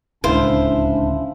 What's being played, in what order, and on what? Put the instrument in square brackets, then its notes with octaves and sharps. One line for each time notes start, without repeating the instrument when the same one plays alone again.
[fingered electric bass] D1 C#2 [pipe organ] C#4 D4 [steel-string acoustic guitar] E4 F5 [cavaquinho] C5